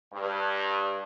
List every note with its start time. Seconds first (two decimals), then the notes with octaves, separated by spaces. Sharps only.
0.13 G2